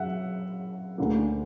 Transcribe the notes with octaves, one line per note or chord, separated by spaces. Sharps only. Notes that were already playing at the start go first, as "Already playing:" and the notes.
Already playing: F#2 F#3 E5 F#5
D2 D3 A#3